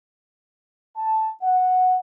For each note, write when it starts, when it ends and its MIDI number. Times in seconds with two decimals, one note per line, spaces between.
0.98 1.29 81
1.42 1.97 78